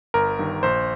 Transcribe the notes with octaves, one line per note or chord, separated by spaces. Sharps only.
G1 A#4
G2 D#3
A#1 C5